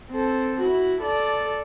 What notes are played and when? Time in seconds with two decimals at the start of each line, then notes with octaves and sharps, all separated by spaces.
0.11 C4 A4
0.61 E4 F#4
1.01 A4 D5